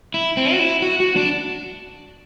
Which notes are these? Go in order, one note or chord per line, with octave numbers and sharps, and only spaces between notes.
E4
C4
F#4
E4
F#4
F#4
D4